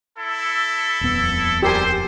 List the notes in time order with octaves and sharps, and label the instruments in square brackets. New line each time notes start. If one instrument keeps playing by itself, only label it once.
[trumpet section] E4 A4
[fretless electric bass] D#1 F2 B3
[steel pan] G4 A#4 G#5 [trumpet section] C5